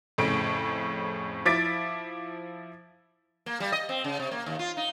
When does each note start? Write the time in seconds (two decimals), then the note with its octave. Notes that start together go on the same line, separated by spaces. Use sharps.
0.18 F2 A2 C#3 D7
1.45 F3 E4 D6 A6 B6 D7
3.46 A#3
3.60 G3
3.72 D#5
3.89 C4
4.04 C#3
4.20 C3
4.31 A#3
4.46 D#2
4.59 F4
4.77 D#4